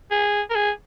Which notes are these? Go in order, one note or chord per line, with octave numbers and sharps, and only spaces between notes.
G#4
A#4
G#4